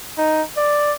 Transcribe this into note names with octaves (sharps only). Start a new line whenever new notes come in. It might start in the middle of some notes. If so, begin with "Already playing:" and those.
D#4
D5